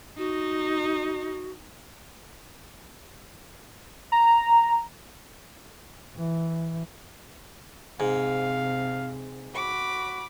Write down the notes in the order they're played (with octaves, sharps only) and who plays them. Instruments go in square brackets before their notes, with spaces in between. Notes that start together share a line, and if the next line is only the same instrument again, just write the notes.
[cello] D#4 [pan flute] F#4
[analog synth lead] A#5
[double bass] E3
[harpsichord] G#2 [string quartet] C3 [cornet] F5
[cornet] F#4 [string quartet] B5 D6